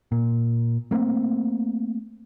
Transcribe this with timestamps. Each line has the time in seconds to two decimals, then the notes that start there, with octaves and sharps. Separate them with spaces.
0.12 A#2
0.91 A3 A#3 C4